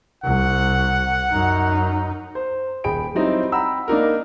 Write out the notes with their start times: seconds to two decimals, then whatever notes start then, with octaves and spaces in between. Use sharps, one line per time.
0.24 C2 F#5
1.31 F#2 D#4
2.35 C5
2.84 D#1 G#4 G5 B5 D7
3.15 F#3 G3 C4 D#4 E4
3.52 F#5 G5 A#5 B5 E6
3.88 A#3 D4 D#4 A#4